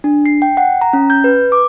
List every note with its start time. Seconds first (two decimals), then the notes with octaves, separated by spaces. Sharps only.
0.04 D4
0.26 C7
0.42 G5
0.57 F#5
0.81 A#5
0.93 C#4
1.10 G6
1.24 B4
1.52 D6